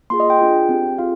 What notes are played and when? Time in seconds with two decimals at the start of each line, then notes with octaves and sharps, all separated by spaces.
0.10 A#3 F4 G#4 C6
0.20 D#5
0.30 G5
0.39 D4 F4 G#4
0.69 C4 G4
0.98 C4 F4 G#4 F5